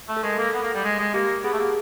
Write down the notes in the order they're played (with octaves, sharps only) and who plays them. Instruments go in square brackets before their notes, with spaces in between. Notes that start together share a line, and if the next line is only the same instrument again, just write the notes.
[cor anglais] A3
[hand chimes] A4
[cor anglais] G#3 [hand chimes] A#4
[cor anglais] A#3 [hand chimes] A4
[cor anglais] B3
A#3
G3
G#3
G#3
[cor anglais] A#3 [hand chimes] G4
[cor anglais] B3 [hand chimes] G#4
[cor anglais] A3
A#3